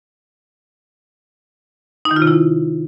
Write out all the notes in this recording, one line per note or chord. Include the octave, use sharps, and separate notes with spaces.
D#4
D#3
F4
C3
E4